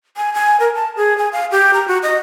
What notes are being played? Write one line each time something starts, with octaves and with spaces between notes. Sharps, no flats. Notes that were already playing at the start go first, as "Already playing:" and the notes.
G#5
G#5
A#4
A5
G#4
G#5
F5
G4
A#5
F#4
D#5